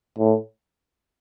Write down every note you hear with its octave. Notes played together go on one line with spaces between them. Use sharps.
A2